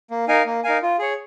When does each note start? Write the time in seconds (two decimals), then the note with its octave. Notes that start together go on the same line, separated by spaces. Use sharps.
0.11 A#3
0.28 D#4 A#4 F5 G#5
0.46 A#3
0.64 D#4 A#4 F5 G#5
0.82 F4
0.99 G#4 C#5